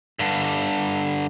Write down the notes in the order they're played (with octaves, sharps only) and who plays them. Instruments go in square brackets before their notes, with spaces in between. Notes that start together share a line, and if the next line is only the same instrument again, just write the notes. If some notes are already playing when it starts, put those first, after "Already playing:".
[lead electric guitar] G2 D3